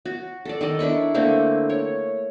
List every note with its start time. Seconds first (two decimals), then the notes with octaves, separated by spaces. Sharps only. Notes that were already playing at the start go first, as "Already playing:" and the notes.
0.05 F#4
0.45 A4 D5
0.61 D#3 D5 D#5
0.79 D4 E4 B5 C#6
1.14 D3 A3 A#3 C4
1.69 C#5